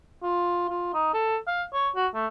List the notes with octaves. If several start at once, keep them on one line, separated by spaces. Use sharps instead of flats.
F4
F4
D#4
A4
F5
C#5
F#4
A3